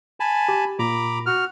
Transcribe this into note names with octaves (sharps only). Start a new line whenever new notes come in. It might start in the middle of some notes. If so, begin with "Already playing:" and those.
G#5 A5 B5
G4
A#2 A#5 B5 D6
F#4 F6